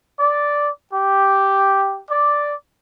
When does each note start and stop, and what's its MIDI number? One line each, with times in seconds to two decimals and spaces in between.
0.20 0.70 74
0.94 2.01 67
2.10 2.53 74